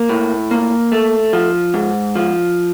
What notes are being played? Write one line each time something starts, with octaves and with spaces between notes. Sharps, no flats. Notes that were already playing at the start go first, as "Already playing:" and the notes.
Already playing: A#3
A2
A#3
A3
F3
G#2
F3